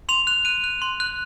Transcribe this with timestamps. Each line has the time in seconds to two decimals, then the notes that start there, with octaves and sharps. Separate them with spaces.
0.09 C6 F7
0.27 F#6 F7
0.45 F#6 D#7
0.64 F#6
0.82 C6
1.00 F#6